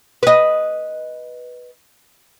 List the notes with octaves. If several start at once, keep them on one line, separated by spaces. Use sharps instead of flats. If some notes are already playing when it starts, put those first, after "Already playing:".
B4 D#5